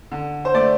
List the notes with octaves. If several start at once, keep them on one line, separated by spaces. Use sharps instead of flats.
D3
C5
A3 D5